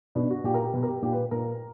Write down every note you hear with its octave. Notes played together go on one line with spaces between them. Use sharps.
B2 D4
F#4
A#2 G4
A#4
G4
B2
A#4
G4
A#2 G4
B4
A#2 A#4